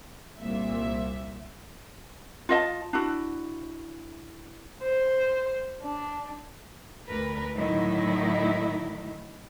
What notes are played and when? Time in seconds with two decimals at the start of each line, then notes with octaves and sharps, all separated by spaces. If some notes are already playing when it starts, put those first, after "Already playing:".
0.40 C2 A#2 E5
2.49 F4 D#5 E5 A5
2.93 D4 E4 F#4
4.83 C5
5.81 D4
7.07 D2 A#4 B4
7.57 A2 D3 D#3 F#3 D#4 E4